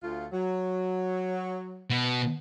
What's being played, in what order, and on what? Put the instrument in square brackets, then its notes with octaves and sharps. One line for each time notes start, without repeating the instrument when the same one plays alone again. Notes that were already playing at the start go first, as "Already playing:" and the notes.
[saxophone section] D2 A3 F4
F#3
[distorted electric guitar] B2